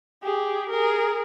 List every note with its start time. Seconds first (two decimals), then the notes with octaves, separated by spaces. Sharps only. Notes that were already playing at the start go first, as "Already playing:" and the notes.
0.23 G4 G#4
0.69 G#4 A#4